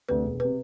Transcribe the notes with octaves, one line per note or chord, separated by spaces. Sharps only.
D2 C3 B4
E1
C3 B4